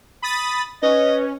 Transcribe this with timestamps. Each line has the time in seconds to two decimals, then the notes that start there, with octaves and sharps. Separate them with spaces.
0.22 B5 D#6 A6
0.82 C#4 B4 D#5